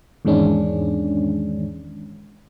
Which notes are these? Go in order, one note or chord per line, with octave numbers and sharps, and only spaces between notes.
E2 G#2 D#3 G#3 C#4 D4